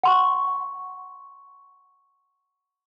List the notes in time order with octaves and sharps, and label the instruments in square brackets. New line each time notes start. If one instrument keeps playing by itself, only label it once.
[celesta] F#5 C6 C#6